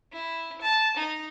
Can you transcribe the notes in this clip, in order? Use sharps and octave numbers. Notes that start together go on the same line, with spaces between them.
E4
A5
D#4